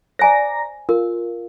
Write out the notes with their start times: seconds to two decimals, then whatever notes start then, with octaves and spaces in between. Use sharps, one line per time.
0.19 C5 D5 G#5 A#5 A#6
0.89 F4 A#4